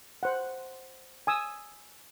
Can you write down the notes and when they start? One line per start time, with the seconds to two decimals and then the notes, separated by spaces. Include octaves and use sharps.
0.23 C5 F#5
1.27 G#5 D#6 E6